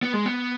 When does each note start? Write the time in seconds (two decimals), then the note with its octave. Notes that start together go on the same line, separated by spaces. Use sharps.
0.03 B3
0.13 G#3
0.26 B3